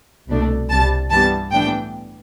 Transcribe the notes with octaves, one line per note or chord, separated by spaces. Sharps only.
C2 B2 A3 D4
C2 C3 G3 A5
G2 E3 G3 B3 A5
A2 E3 B3 D4 G5